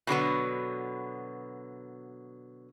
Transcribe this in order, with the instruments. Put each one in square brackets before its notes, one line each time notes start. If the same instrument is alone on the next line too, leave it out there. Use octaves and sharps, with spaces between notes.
[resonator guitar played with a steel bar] B2 D3 F#3 B3